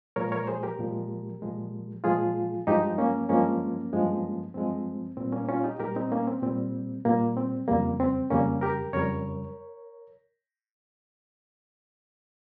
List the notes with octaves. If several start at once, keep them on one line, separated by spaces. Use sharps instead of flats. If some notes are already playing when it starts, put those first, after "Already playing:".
A#2 F3 G#3 A#4 C#5
A#4 C#5
G#4 C5
G4 A#4
A#2 F3 G#3
A#2 F3 G#3
A#2 F3 G#3 F4 G#4
G2 F3 G#3 D#4 G4
A#3 C#4
G2 F3 G#3 A#3 C#4
G2 F3 G#3
G2 F3 G#3 C4
A#2 G3 C4
A#3 C#4
C#4 F4
D#4 G4
A#2 G3 G4 A#4
C4 D#4
A#3 C#4
C4
A#2 G3 C4
A#2 G3 A#3
C4
F2 C#3 G3 A#3
C4
F2 C#3 G3 A#3 C#4
G4 A#4
F2 C#3 G3 A#4 C#5